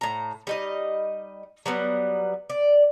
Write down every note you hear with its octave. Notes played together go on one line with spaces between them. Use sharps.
A2 A#5
G3 D#4 D#5
F#3 G3 B3
D5